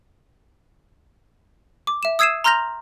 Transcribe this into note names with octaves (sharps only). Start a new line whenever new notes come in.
D6
E5 E7
D#6 E6 G#6 C7 D#7 E7
A#5 C6 F6 G6 A#6 F7